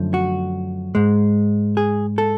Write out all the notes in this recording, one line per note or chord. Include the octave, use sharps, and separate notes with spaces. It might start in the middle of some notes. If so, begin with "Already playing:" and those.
Already playing: F#2 D3 F3 A3
F#4
G#2 G#3
G#4
A4